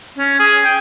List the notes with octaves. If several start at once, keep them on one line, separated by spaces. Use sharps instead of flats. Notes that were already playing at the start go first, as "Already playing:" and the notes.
C#4
G#4
G5